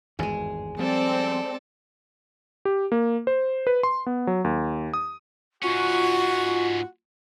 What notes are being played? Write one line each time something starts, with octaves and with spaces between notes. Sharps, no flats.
G#1 E2 G2 G#3 G#4
F3 G3 C4 A4 D5
G4
A#3
C5
B4
C6
B3
F#3
D#2
D#6
G#2 C#4 F4 F#4 C#6